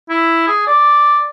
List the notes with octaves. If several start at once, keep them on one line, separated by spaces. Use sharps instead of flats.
E4
G#4
D5